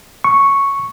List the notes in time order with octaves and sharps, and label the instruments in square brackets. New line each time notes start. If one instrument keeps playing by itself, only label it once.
[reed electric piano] C#6